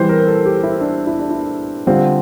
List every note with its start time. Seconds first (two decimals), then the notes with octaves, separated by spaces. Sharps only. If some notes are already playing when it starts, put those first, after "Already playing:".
Already playing: E3 G3 C4 C5
0.09 A#4
0.27 A4
0.46 G4
0.63 E4
0.81 D4
1.07 E4
1.19 D4
1.31 E4
1.87 D3 G3 C4 F4